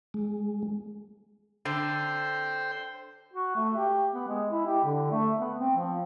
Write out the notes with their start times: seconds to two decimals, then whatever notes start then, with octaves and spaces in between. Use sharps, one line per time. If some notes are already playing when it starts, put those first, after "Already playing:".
0.14 G#3
1.65 D3 C5 G5
3.33 F#4
3.56 A3
3.76 G4
4.14 B3
4.28 G#3
4.51 E4
4.67 G4
4.84 D3
5.11 A3
5.40 B3
5.58 C4
5.76 F3